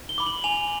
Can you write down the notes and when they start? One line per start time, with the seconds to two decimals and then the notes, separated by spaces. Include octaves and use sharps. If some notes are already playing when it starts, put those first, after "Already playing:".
0.09 G7
0.18 B5 D6
0.27 F#7
0.44 G#5 F7